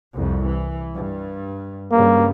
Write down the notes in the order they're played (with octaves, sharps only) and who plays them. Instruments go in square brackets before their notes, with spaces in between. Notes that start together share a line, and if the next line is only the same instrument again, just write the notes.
[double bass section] C2 F2
E3
G2
[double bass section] G2 C#3 G3 [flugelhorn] A#3